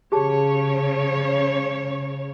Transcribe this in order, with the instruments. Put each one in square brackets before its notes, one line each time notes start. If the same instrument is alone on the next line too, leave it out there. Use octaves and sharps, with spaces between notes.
[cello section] C#3 C#5 [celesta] G4 G#4 A5